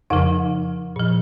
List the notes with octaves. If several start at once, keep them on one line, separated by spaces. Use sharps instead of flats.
F2 C#3 F3 D#4
A#2 F3